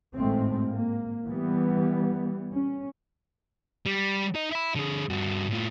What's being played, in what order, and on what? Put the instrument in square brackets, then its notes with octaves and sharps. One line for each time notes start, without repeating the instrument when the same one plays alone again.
[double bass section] G#1 A2 G#3 A3 C4
A#3
E3 G3 B3
C#4
[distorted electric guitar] G3
D#4 D#5
E5 B5
D3 G#4
G2 F#4
A2 F4